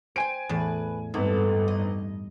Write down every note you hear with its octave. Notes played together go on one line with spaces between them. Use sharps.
C5 G5 G#5 D7
E2 A2 B4 A5
G#1 G2 B3 A4
D#5